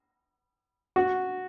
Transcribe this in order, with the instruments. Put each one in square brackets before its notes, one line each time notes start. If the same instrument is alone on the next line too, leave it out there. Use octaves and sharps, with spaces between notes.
[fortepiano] F#4